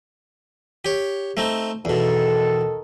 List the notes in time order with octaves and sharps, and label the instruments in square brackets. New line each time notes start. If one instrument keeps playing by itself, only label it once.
[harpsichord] G4 C#5
A3 C4 D#4
[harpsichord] E2 B2 [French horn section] D#3 A4